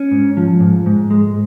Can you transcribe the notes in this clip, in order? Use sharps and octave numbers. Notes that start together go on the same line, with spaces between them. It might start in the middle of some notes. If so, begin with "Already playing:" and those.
Already playing: C#4
G#2
F3
G#2
G#2
G#3